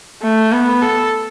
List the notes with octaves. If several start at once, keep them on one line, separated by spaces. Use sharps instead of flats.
A3
B3
A4